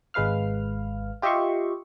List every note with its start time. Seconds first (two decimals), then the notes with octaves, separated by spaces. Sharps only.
0.14 G#1 G#3 B4 F5 F6
1.22 F4 G4 D#5 E5 C6 C#6